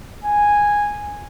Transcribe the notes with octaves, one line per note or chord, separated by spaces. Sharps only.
G#5